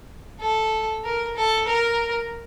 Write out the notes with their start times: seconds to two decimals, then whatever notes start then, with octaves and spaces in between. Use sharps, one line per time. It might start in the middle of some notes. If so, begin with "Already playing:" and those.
0.41 A4
1.04 A#4
1.36 A4
1.67 A#4